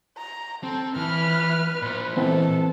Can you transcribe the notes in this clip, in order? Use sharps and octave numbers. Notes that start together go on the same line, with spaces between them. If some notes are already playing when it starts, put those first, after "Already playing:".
A#5
C4 A4
E3 B4 F6
A#2 C5
E3 G#3 B3 C4 A4 A5